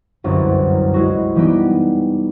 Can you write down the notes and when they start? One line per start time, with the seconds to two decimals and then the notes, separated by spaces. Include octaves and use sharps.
0.24 G1 C2 F#2
0.94 G#3 E4 F#4
1.35 E3 G3 B3 D#4 G4